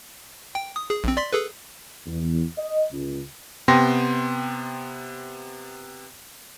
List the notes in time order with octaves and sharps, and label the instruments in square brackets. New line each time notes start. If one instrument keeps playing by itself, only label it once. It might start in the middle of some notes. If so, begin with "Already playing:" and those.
[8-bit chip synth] G5
D#6
G#4
A#1 C4
D5 C6 B6
G#4 A4 B4
[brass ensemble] E2
D#5
C#2
[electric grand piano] C3 B3 G5 C6 A#6